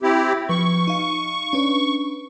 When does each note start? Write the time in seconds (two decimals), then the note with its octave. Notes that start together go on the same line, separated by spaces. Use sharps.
0.03 C4 E4 G4
0.49 F3 B4 C#6
0.87 D#4 F5
1.53 C#4 D4 B4